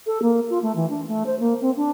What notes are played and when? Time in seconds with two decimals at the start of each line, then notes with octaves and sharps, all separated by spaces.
0.07 A4
0.22 A#3
0.50 F4
0.62 A3
0.75 E3
0.89 D4
1.08 A3
1.26 C5
1.40 A#3
1.61 C4
1.76 D4